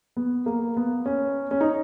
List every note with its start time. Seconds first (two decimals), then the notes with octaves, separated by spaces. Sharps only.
0.17 B3
0.46 A#3
0.77 B3
1.06 C#4
1.51 C#4
1.61 D#4